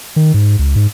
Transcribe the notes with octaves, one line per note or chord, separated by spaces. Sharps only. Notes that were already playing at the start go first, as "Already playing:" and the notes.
D#3
G#2
C#2
G#2